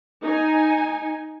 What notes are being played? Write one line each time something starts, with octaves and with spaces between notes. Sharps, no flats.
D#4 G#5